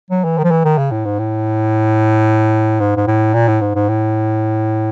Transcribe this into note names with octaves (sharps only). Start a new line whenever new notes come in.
F#3
E3
D#3
F3
E3
D#3
C#3
A2
G#2
A2
G#2
G#2
A2
A#2
A2
G#2
G#2
A2